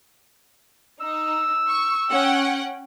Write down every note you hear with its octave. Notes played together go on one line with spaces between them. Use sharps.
D#4 E6
C#6
C#4 F#5 G5